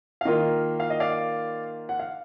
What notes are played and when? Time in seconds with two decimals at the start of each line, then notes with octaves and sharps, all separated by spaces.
0.21 F5
0.25 D#3 A#3 F4 D#5
0.80 F5
0.90 D#5
1.00 D5 F5
1.89 F#5
2.00 F5